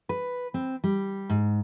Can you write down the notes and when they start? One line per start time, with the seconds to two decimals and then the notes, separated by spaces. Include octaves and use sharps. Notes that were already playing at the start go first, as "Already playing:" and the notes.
0.09 B4
0.54 C4
0.84 G3
1.29 G#2